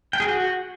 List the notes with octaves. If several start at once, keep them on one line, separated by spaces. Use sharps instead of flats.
G5
G#4
F#4